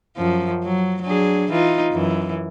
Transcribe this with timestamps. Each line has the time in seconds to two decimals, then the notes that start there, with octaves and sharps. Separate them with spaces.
0.17 F#2 F3
0.63 F#3
1.02 F#3 D4 G#4
1.51 E3 D#4 F4
1.92 F#2 E3